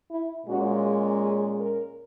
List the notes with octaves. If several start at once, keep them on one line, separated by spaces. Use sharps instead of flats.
E4
A#2 G#3 C#4 F#4
G#4
G#4
A#4